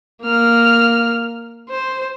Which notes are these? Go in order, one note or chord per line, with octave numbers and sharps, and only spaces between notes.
A#3 F6
C5